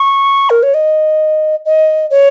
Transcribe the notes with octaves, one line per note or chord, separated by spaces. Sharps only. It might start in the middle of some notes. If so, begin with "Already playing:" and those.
Already playing: C#6
A#4
C#5
D#5
D#5
C#5